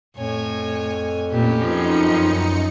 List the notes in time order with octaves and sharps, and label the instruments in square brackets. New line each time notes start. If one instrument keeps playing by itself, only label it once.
[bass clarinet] F2 [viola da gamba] A2 [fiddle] C#5 G#5
[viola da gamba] A#2 A3 [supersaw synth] C#4 [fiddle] G4 B4
[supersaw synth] F#2 D#4 C#7 [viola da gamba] F3 C4 G#4